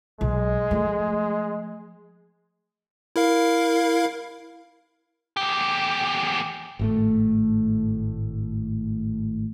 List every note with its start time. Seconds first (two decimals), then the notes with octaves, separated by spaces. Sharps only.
0.21 B1 G#3
0.71 F3 A3
3.16 E4 A#4 F5
5.37 E2 G4
6.79 G#1 A2 A3